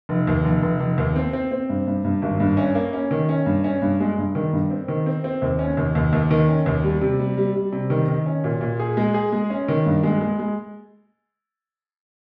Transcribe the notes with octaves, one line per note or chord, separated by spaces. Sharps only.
F1
D#2
F1
F1
F1
D#2
C4
C4
C4
G2
G2
G2
G#1
G2
C#4
A#3
C#4
D#3
C#4
G2
C#4
G2
G#3
G2
D#3
G2
C4
D#3
C4
C4
D#2
C#4
D#2
D#2
D#2
D#3
C#4
D#2
G3
C3
G3
G3
G3
C3
D#3
D#3
C#4
A#2
A#2
G#4
G#3
G#4
G#3
C#4
D#3
G2
G#3
G#3
G#3